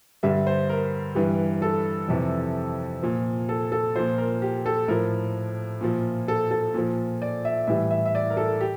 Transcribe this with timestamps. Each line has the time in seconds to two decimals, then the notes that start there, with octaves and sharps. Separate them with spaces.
0.23 G2 D3 G3 E5
0.47 C5
0.69 A#4
1.15 G2 E3 G3
1.62 A4
2.08 F2 C3 E3
3.02 A#2 F3
3.49 A4
3.72 A4
3.96 A#2 F3 C5
4.18 A#4
4.42 G4
4.66 A4
4.88 A2 F3 A#4
5.81 A#2 F3
6.28 A4
6.51 A4
6.74 A#2 F3
7.22 D5
7.45 E5
7.67 A2 E3 G3 E5
7.91 E5
8.06 E5
8.15 D5
8.30 A#4
8.37 A4
8.61 G4